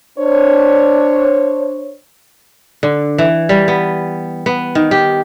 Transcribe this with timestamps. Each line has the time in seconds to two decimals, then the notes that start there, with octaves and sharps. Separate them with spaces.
0.19 D4 C5 C#5
2.83 D3
3.18 E3
3.49 G3
3.68 B3
4.46 B3
4.75 D#3
4.91 G4